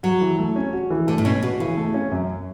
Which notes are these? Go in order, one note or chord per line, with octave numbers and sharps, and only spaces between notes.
F#3 F#4
E3
A3
C#4
F#4
E3
D3 A3
A2
B2 C#4
B2 F#4
C#3 E3
A3
C#4
F#2